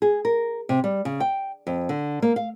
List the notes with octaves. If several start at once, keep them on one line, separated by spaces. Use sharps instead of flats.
G#4
A#4
C3
G3
C#3
G5
F2
D3
A#3
F5